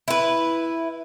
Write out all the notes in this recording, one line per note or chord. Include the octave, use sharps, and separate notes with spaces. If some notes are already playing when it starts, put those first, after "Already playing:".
E4 B4